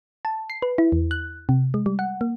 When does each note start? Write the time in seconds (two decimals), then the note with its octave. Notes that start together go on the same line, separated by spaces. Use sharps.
0.25 A5
0.50 C7
0.62 B4
0.78 E4
0.92 E2
1.11 F#6
1.49 C3
1.74 G#3
1.86 G3
1.99 F#5
2.21 A#3